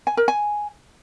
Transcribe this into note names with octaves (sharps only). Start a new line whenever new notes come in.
G#5
A#4
G#5